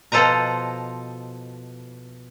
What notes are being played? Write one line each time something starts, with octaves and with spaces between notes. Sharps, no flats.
B2 F3 A4 C5 D#5 A#5